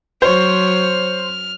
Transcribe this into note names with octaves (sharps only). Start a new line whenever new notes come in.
F#3 C5 C#5 F6